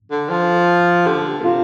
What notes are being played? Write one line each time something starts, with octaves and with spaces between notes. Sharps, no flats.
D3
F3
D3 G4
A#2
C3 F4